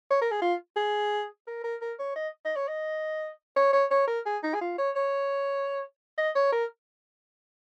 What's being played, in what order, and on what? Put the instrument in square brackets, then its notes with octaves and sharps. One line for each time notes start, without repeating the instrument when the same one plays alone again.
[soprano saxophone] C#5
A#4
G#4
F4
G#4
A#4
A#4
A#4
C#5
D#5
D#5
C#5
D#5
C#5
C#5
C#5
A#4
G#4
D#4
G#4
F4
C#5
C#5
D#5
C#5
A#4